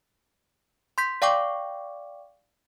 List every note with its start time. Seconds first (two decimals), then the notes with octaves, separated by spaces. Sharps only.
0.98 C6 G6 B6
1.22 D5 F5 G5 C#6 D6